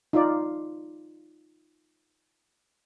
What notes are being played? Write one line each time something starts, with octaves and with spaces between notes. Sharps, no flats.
D#4 F4 D5